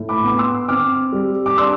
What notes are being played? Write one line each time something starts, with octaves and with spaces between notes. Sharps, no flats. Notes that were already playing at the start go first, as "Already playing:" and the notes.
Already playing: A2
B5 D6
B3 D6
C6 E6
C4 D6 F6
G3
D6
D4 C6 E6